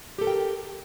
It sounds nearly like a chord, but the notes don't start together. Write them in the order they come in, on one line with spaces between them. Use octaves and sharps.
G4 A4 A#4 G5